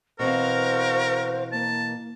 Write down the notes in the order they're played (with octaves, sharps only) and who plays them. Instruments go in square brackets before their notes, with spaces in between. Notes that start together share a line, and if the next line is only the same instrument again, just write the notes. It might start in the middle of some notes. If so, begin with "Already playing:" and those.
[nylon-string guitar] B2 E3 C4 [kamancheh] F#4 F5 [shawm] A#4 [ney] C5
[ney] A#3 [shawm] A5